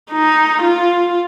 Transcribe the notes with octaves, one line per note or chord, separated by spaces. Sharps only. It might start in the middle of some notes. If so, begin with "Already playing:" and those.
D#4
F4